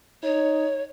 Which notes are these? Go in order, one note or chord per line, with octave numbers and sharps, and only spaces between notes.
D#4 C#5